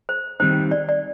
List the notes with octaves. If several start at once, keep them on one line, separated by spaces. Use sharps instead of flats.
C5
D#3 G3 C4 D#4 C5
D5
D5